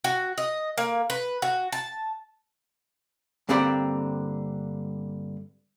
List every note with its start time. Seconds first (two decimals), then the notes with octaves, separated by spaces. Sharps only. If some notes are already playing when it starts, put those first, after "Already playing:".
0.04 F#4
0.38 D#5
0.78 A#3
1.10 B4
1.42 F#4
1.72 A5
3.49 G2 D3 A#3 C4 D5 B5